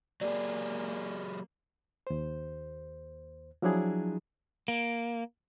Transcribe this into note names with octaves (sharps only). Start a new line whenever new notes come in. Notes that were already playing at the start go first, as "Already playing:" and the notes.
F#3 A#3 G4 G#4 D5
D#2 C5
F3 F#3 D4 E4 G#4
A#3